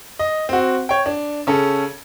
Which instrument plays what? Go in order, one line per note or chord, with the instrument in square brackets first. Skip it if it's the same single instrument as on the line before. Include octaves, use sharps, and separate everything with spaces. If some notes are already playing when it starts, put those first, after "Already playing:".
[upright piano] D#5
C4 F#4
C#5 G5
D4
C#3 C#4 A4